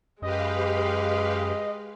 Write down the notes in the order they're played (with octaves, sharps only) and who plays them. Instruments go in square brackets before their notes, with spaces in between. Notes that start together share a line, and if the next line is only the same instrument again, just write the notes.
[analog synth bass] F#2 [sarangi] G#3 [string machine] G4 B4 F5 [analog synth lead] D#5